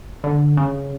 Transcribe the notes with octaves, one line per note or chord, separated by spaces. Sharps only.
D3
C#3